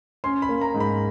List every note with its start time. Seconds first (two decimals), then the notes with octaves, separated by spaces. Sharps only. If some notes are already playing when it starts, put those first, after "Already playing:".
0.24 C#4 C6
0.42 B5
0.49 A#3
0.61 A#5
0.74 G#2
0.80 B5